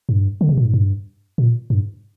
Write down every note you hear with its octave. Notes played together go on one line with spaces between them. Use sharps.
G2
D3
C3
A#2
G#2
G2
A#2
G2